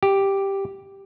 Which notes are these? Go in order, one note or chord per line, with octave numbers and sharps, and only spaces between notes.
G4